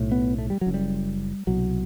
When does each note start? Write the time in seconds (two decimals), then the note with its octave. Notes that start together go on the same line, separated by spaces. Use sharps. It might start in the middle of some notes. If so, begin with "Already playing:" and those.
Already playing: B1 A2
0.11 B3
0.38 A3
0.50 G3
0.61 F#3
0.66 F#1 F#2
0.74 G3
1.47 C2 B2 F#3